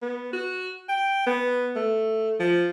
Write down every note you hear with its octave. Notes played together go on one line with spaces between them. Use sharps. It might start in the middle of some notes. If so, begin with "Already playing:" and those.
B3
F#4
G5
B3
A3
F3